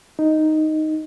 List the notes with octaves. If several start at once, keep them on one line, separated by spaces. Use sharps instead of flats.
D#4